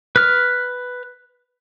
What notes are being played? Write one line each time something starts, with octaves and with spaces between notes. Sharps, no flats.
B4 F6